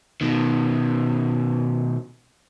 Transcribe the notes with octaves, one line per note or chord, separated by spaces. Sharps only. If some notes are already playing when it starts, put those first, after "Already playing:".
B2 D#3